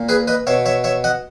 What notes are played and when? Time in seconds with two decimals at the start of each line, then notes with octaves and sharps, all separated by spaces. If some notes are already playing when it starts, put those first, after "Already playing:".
Already playing: A#2
0.09 G#4 B4
0.28 B4 D#5
0.47 B2 C#5 E5
0.66 C#5 E5
0.84 C#5 E5
1.04 D#5 F#5